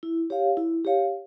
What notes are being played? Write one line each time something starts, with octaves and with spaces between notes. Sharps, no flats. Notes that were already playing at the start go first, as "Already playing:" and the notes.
E4
G4 C#5 F5
E4
G4 C#5 F5